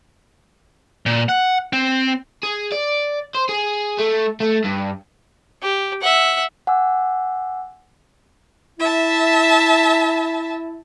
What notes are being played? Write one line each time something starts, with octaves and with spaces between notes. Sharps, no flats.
A#2
F#5
C4
G#4
D5
C5
G#4
A3
A3
G2
G4
E5 F#5
F#5 G#5 D6 E6
E4 E5 A5